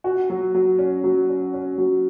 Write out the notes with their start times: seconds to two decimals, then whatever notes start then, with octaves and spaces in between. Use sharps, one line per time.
0.04 F#4
0.30 F#3
0.54 F#3
0.79 C#4
1.04 F#3
1.29 C#4
1.53 C#4
1.78 F#3